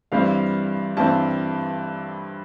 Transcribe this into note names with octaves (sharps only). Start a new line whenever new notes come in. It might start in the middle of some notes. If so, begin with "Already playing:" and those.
G2 E3 G3 C4 F5
G2 E3 G3 C4 A5